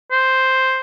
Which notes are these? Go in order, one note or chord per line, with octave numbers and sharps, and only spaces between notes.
C5